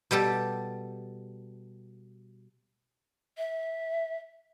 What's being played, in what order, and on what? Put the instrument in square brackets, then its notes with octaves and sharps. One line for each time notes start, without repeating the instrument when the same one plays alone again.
[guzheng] B2 G3 G4 A4
[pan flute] E5